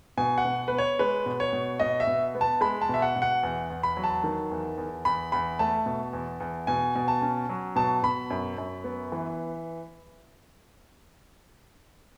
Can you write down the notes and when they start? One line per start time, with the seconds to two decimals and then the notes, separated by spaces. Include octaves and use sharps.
0.17 B2 G#5
0.38 F#5
0.45 B2
0.68 B3 B4
0.78 C#5
0.99 G#3 B4
1.26 B2
1.40 C#5
1.53 B2
1.80 B2 D#5
2.00 E5
2.07 B2
2.35 B3
2.41 A5
2.61 G#3 B5
2.81 A5
2.89 B2 E5
3.02 F#5
3.16 B2
3.22 F#5
3.43 E2
3.70 E2
3.83 B5
3.97 F#3
4.04 A5
4.24 D#3
4.51 E2
4.78 E2
5.05 E2 B5
5.32 E2 B5
5.59 A3 A5
5.86 B2
6.13 E2
6.40 E2
6.67 B2 G#5
6.95 B2
7.08 A5
7.22 C#4
7.49 F#3
7.76 B2 A5
8.03 B2 B5
8.30 F#2
8.58 F#2
8.84 B3
9.12 E3